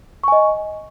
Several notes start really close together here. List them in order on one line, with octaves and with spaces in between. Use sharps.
C#6 G#5 D#5